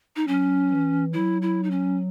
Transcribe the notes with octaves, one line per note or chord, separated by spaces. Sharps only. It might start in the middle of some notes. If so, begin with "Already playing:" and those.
D#4
F#3 C#4
E3
F#3 E4
E4
D#4
C#4